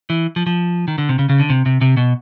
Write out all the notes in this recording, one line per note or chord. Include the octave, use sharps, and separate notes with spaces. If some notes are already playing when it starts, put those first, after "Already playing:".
E3
F3
F3
D#3
D3
C3
C#3
C#3
D3
C3
C3
C3
B2